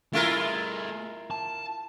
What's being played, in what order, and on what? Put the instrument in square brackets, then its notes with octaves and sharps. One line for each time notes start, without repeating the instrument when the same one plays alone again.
[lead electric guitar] A3 G#4 [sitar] E4 F4 A#4
[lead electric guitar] A5